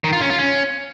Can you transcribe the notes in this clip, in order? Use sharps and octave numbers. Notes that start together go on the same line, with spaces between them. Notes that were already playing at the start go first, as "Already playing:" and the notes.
D#3
F4
C#4
F4
C#4